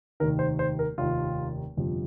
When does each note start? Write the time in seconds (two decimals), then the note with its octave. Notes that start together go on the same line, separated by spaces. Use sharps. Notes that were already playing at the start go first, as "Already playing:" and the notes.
0.20 F1 D#2 D#3 A#4
0.39 C5
0.59 C5
0.79 A#4
0.98 F1 D#2 D#3 F4
1.77 G1 F2 C3 F3